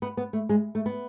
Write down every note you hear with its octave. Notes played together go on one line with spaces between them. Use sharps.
B3
B3
A3
G#3
A3
B3